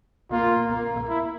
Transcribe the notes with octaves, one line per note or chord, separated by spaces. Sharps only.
A#3 F4
A#3
E4